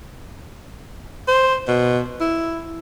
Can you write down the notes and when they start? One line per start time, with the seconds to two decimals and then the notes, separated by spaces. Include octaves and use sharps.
1.28 C5
1.68 B2
2.20 E4